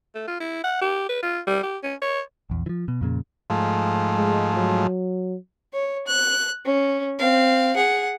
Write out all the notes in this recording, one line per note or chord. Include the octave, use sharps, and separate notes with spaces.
A3
F4
E4
F#5
G4
B4
F4
G3
G4
C#4
C#5
A#1 E2
E3 F3
B2
F2 A#2 C#3
G#2 F3 A3
G#3
F#3
C#5
F#6
C#4
C4 F5
G#4 F#5